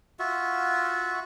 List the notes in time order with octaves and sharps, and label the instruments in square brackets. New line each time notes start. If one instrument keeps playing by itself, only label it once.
[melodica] F4 F#4 E5